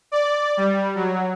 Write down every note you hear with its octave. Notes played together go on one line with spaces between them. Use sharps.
D5
G3
F#3